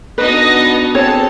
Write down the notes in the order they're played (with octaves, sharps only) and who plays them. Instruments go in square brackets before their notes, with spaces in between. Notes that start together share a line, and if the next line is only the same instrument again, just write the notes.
[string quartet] B3 D4 F#4 [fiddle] D#4 D#5 [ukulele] B4
[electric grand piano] C4 G#4 [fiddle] A4 A5 [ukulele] C#5